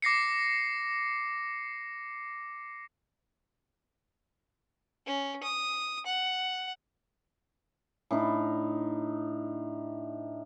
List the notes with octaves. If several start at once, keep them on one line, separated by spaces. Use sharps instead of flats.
D6 A#6 C7 C#7
C#4
D#6
F#5
A2 D4 D#4